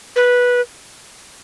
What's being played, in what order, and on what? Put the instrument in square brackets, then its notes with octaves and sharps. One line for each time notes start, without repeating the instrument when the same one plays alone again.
[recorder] B4